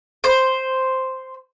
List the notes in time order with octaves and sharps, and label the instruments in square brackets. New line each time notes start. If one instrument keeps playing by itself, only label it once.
[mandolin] C5